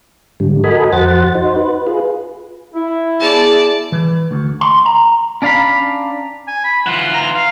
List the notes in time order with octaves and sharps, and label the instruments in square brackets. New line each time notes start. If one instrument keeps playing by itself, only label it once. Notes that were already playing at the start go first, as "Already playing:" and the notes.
[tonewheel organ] G#2 D3 G3
F#4 A4 A#4 D#5 G#5 B5
F2 F#4 C5 F#5 A6
D#4 F#4 C5
B4
F4 G#4 B4
[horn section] E4
[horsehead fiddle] B3 G#4 [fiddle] D5 A5
[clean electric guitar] E3
D2
C6
A#5
C#4 D4 D5 F5 A#5 B5
[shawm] G#5
B5
[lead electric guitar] E3 F4 [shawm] F#5
[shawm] A#5
F5